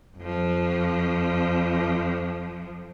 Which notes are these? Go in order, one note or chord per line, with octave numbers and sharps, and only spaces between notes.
F2 F3